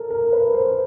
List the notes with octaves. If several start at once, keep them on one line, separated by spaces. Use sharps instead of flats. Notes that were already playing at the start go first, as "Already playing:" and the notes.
Already playing: A4 A#4
A#4
B4
C5